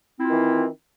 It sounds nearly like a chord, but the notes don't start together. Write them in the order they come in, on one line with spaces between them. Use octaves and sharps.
C4 E4 F4 D#3 E3